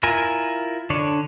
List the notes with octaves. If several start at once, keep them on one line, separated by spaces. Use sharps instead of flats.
E4 F4 A#4 G#5
D3 D4 C#5